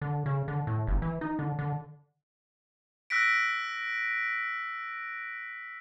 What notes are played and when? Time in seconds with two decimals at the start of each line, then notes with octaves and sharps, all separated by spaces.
0.02 D3
0.26 C#3
0.48 D3
0.67 A2
0.87 G1
1.02 E3
1.21 D#4
1.39 D3
1.59 D3
3.10 E6 F#6 A#6 B6 D7